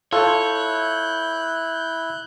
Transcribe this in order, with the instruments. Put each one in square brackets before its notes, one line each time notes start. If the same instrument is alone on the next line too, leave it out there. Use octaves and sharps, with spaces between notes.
[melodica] E4 [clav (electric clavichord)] F4 A4 [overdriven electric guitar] C#5 [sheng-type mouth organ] F#6 G6